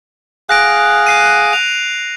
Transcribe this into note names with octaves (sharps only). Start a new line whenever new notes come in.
G#4 F5 F#5 F#6 A#6 D7
F#6 C7 D#7
F7